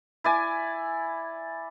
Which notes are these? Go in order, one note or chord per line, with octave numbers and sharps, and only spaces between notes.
E4 D5 G#5